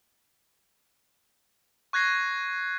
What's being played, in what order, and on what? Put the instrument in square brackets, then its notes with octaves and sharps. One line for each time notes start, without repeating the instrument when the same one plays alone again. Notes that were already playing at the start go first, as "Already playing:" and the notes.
[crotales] C#6 F#6 G#6 A#6 C7